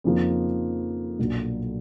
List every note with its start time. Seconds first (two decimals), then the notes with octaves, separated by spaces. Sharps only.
0.04 F2 C#3 F3 A#3 D#4
1.19 B1 A#2 F#3 A#3 D4